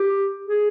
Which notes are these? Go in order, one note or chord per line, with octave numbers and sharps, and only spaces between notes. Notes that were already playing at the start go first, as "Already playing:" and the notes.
Already playing: G4
G#4